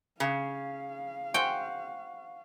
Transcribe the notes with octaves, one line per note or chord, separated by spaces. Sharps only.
C#3 F5
G#3 C4 F#4 G5